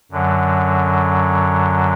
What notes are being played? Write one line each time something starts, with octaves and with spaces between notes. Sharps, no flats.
F#2 D3 F#3